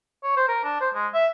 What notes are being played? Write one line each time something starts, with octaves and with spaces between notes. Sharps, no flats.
C#5
C5
A#4
D4
C5
G#3
E5